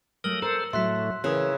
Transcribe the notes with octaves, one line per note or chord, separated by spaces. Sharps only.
F#3 A3 A#4 D#6 E6 F#7 G7
A4 A#4 C5
A2 F#3 A3 F#4 E5 C6 F#6 B6
C#3 E3 E4 A#4 D#6 F#6